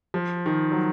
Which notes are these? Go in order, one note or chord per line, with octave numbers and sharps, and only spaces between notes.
F3
D#3
F#3